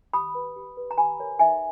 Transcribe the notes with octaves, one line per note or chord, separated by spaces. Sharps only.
G4 B5 D#6
B4
G4
B4
A#5
G4 G#5 B5
A#4 C#5
D#4 E5 G#5